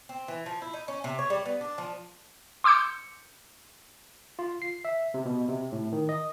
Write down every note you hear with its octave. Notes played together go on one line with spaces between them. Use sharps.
C4
E3
F3
E4
D#4
C#4
C3
C#5
G3
B3
D4
F3
C6 D6 E6 G6 C#7
F4
C7
E5
C3
B2
C3
A2
D#3
D#5